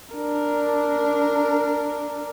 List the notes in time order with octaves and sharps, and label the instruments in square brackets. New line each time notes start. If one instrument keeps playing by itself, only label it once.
[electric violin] D4 A#4